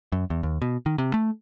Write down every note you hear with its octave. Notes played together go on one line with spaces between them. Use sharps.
F#2
E2
D#2
B2
D#3
C3
A3